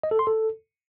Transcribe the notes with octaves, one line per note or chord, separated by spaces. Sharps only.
D#5
A4
C6
A4